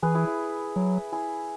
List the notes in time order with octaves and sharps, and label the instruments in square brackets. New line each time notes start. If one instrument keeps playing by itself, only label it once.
[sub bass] E3 [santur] G#4 B4
[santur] E4 G#4
E4
[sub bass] F#3
[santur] E4 G#4